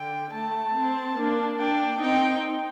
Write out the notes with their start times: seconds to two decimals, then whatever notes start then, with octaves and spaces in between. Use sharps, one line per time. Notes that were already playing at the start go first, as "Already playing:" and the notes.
Already playing: D3 G5
0.33 A3 A5
0.76 C4
1.17 A#3 D4
1.59 A#3 D4 G5
2.00 C4 D#4 G5